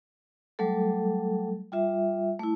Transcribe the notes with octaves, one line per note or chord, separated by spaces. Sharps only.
F#3 G3 A3 A4
G3 F4 E5
A3 E4